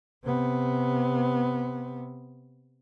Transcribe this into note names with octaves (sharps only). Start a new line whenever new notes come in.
C3 B3